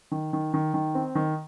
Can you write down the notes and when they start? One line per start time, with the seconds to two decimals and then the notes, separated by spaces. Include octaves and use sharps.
0.11 D#3
0.33 D#3
0.54 D#3
0.74 D#3
0.95 C4
1.15 D#3